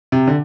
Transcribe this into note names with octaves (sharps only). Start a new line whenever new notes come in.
C3
D3